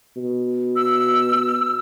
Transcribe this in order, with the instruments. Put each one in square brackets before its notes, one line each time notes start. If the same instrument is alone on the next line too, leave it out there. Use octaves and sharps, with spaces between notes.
[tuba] B2
[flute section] E6